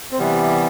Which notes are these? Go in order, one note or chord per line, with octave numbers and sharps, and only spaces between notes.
C4
C3 E3 G3 B3